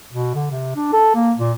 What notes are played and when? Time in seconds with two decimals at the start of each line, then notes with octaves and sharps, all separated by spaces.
0.12 B2
0.34 D3
0.51 C3
0.76 D4
0.93 A4
1.15 A#3
1.38 A#2